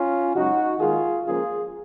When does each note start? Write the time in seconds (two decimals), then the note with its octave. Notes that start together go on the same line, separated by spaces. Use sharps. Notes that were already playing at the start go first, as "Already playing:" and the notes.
Already playing: C#4 F4
0.34 F#2 C#3 G#3 D#4 F#4
0.79 D#2 D#3 G#3 F4 G#4
1.24 C#2 C#3 F3 A#3 F4 G#4